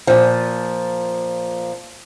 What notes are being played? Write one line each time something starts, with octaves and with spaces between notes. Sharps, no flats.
A#2 F3